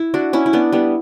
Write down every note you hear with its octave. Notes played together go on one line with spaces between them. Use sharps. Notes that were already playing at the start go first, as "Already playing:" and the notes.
Already playing: E4
D4 F#4
C#4 E4
E4
B3 D4
G3 B3